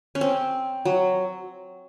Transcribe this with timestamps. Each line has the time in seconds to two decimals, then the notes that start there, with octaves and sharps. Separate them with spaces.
0.15 C#4
0.21 C4
0.85 F#3